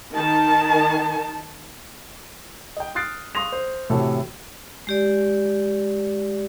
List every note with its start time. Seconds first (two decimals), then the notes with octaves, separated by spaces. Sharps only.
0.14 D#3 A5
2.77 D#5 G5
2.95 D#6 F6 F#6 A6 C7 D7
3.35 F5 C6 C#6 D#6 A#6 F7
3.52 C5
3.90 A2 C3 E3 A3 F#4 A4
4.87 G#3 G4 D5